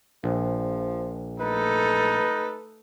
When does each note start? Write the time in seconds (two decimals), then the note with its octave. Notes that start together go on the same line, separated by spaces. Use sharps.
0.24 A#1 F3
1.40 A3 D#4 A4 B4